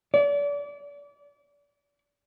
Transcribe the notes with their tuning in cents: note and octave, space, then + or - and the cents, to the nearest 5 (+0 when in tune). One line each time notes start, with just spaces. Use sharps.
D5 -35